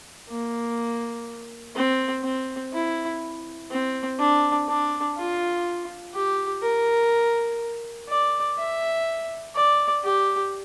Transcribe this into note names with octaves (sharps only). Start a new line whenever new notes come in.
A#3
C4
C4
E4
C4
D4
D4
F4
G4
A#4
D5
E5
D5
G4